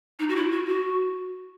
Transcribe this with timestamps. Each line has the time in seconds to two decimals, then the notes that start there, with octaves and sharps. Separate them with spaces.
0.19 D#4
0.29 F#4
0.36 E4
0.52 F#4
0.68 F#4